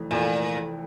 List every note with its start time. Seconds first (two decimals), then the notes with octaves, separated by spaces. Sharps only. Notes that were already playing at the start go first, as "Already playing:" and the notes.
Already playing: F1 F2 E3 A3
0.11 F1 F2 A#2 E3 A3